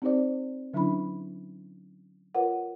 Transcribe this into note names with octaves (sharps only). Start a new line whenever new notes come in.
C4 D#4 G4 C5 D5
D3 F#3 C#4 D4 E4 B5
F4 A#4 B4 C#5 F#5